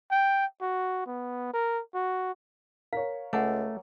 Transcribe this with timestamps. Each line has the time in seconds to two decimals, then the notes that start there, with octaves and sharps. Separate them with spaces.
0.11 G5
0.61 F#4
1.06 B3
1.54 A#4
1.94 F#4
2.93 A#4 C#5 F5
3.33 C#2 A3 F#5 G#5 D6